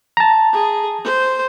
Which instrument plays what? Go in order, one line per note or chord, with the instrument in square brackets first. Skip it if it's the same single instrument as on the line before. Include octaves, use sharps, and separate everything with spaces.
[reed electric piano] A5 A#5
[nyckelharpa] G#4
C5